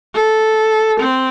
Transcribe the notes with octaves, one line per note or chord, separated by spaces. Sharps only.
A4
C4